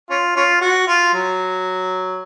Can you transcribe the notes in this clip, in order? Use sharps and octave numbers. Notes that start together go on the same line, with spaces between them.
C#4 F4
C#4 F4
F#4
F4
F#3